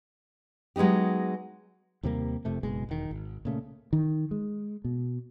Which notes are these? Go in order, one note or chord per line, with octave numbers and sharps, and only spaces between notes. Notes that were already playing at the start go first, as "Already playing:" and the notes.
F#3 G#3 B3 D#4 G4
D#2 C3 G3 A#3
F1 F2 C3 A3
F#1 B2 G#3
E1 D#3
G#1
A#2 C#3 A3
D#3
G#3
B2